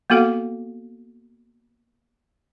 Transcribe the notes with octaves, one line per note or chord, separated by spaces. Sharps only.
A#3 B3 F#4 A4 F5 F#5